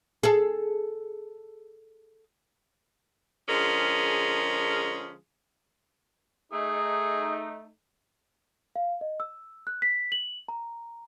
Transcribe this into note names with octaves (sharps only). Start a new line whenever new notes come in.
G#4 A4
D3 F3 G#3 C#4 G#4 A#4
A3 D#4 G#4
F5
D#5
E6
F#6
B6
F#7
A#5